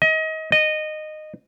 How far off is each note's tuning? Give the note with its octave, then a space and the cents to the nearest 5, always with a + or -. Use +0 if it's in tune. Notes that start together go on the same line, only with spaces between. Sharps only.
D#5 +30
D#5 -15